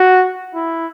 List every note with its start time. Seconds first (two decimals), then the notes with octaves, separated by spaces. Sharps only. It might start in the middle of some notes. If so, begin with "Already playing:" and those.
Already playing: F#4
0.55 E4